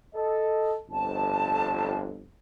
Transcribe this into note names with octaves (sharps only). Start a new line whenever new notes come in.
A4 D#5
G1 F2 A5